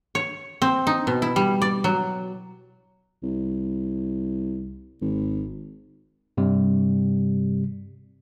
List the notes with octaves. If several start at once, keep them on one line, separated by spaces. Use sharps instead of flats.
C#5
C4
D#4
B2
E4
G3
D5
F#3
C2
G#1
G2 C3 G3